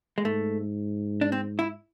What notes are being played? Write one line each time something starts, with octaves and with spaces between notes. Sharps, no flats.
G#3
G#2 A3
D4
C4
E4